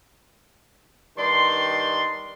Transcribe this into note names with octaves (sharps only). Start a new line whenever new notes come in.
G2 D#3 D5 C6